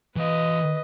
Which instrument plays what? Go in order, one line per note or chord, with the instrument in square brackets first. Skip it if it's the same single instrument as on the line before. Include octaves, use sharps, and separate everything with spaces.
[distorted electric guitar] E3 F5 [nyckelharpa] B4 D#5